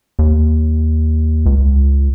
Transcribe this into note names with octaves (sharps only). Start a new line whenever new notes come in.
D#2
C#2